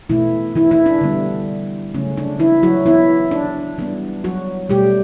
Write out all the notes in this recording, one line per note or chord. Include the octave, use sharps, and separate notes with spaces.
B2 E3 A3 E4
E3 E4
E3 E4
D4
D3 G3 B3
C#3 F#3 A3 C#4
D4
E3 E4
F#3 F#4
E3 B3 E4
D4
E3 G3 B3 D4
F#3 F#4
B2 G3 A3 G4